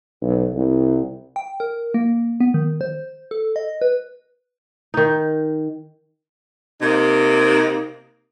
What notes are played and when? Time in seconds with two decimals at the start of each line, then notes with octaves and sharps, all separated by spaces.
0.22 B1
0.54 C2
1.36 G5
1.60 A#4
1.94 A#3
2.40 B3
2.54 D#3
2.81 C5
3.31 A4
3.56 D#5
3.82 B4
4.94 D#3 D#4
6.81 C3 A#3 D#4